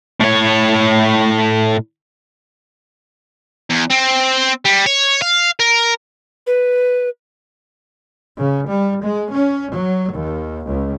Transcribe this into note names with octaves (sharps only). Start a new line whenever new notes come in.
A2 C#5
E2
C4
G3
C#5
F5
A#4
B4
C#3
G3
G#3
C#4
F#3
D#2
C#2